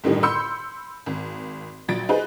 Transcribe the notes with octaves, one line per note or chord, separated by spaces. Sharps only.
G1 F#2 A2 D3 D#3 G3
B5 C6 E6 G6 C#7
G#1
A#1 F#3 A6 D7
D#4 G#4 B4 C5